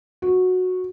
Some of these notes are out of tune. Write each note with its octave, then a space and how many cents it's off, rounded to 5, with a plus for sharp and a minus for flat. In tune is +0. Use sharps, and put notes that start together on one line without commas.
F#4 -10